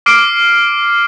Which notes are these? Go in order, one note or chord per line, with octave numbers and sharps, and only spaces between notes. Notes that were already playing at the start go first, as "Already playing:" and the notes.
D6 F6 C7 D7